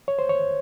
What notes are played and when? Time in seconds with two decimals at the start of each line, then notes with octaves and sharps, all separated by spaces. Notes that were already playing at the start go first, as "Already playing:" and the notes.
0.08 C#5
0.19 C5
0.29 C#5